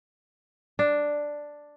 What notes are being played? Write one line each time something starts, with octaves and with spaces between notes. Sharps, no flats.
D4